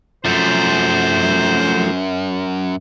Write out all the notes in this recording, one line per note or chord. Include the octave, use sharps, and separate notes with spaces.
F#2 F3 A3 C5